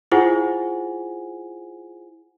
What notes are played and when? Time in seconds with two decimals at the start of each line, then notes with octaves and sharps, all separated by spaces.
0.12 E4 F4 G#4 C5 F#5 G#5